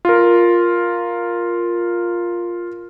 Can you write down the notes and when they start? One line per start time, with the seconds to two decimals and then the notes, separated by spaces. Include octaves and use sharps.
0.05 F4 A#4